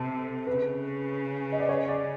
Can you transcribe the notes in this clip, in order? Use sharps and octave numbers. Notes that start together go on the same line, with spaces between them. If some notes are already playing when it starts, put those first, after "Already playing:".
Already playing: C3 A4
C#3 B4
D#5
D5
C#5
D5